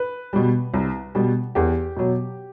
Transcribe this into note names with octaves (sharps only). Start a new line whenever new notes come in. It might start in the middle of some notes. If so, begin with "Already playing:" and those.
Already playing: B4
B2 G3
C2
B2 G3
E2 G4
B2 F#3